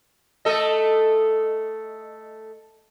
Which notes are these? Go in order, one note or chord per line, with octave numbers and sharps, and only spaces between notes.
A3 A4 D#5